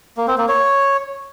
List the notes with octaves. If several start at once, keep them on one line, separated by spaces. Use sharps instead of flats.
A#3
C4
A#3
C#5